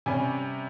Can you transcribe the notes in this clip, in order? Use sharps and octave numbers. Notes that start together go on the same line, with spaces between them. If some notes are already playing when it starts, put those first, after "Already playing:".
C3 G3 C#4 G#5